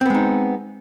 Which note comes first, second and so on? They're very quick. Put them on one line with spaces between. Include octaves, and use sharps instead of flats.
C4 B3 G#3 D#4